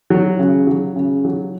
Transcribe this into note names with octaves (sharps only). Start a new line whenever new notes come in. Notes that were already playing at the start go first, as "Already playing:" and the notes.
F#3
C#3
F#3
C#3
F#3